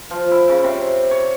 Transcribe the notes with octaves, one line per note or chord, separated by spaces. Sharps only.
F3
E4
C#3
C3
C#5